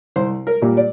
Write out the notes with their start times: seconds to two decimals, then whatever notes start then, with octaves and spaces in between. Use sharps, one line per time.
0.16 C2 C5
0.47 A#4
0.62 A#2 G3 A#3
0.77 D5